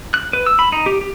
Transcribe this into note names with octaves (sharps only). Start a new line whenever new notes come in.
F#6
B4
E6
B5
D#4
G4
G4